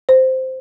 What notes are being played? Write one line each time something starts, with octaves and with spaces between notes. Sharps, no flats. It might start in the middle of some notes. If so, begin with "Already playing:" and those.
C5